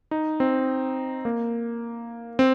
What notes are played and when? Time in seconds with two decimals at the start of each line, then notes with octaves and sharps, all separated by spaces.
0.11 D#4
0.40 C4
1.25 A#3
2.39 C4